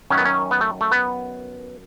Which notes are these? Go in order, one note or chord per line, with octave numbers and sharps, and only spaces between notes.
F#2 D#3 F#3 C#4
B3
C#4
B3
A3
A3
B3